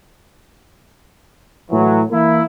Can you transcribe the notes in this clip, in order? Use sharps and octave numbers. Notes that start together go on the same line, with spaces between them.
A2 E3 F#3
E3 A#3 E4